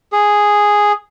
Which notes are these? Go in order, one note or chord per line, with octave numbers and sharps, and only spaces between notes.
G#4